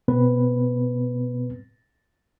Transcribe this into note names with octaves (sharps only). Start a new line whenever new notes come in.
B2 B3 C4 B4